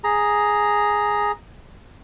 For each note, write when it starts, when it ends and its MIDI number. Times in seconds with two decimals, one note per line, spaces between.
0.04 1.32 68
0.04 1.32 82